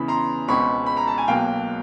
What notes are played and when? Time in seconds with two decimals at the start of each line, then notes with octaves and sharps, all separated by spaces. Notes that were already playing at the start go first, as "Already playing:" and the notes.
Already playing: E2 C#3 E3 B5
0.08 A#5 C6
0.48 C#2 B2 G#3 C4 B5 C#6
0.86 B5
0.97 A#5
1.07 A5
1.18 G#5
1.28 B1 B2 F#3 A#3 F5 G5